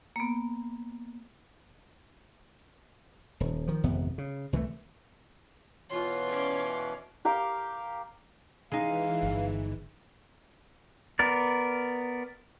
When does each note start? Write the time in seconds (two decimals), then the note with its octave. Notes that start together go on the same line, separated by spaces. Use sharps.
0.16 A#3 B3
3.40 D#1
3.67 D#3 F3
3.84 G#1 F2 C3 B3
4.18 C#3
4.53 C2 E3 G#3 A3
5.90 B2 E3 F4 C#5 C6
6.30 C#4 D5 F5
7.25 G4 A#4 F5 G5
8.72 E3 G#3 D#4 F5
9.23 G1
11.19 B3 A#4 D5